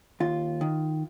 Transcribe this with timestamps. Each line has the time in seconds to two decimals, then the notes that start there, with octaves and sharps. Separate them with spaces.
0.20 D#2 F4
0.61 D#3